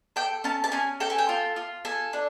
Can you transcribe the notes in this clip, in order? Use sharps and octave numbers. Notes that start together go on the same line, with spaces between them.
A4 G5
C#4 A5
A5
C#4 G#5
A4 G5
G#5
G5
F4
F4
A4 G#5
D4